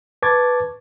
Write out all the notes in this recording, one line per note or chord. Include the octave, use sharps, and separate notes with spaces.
B4 A5 C#6 D6 G#6 A6